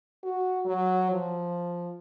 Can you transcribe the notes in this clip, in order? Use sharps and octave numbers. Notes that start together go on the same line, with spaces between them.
F#4
F#3
F3